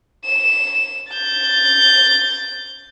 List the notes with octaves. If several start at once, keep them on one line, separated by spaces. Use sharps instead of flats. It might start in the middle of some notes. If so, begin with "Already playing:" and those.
E7
G6 A6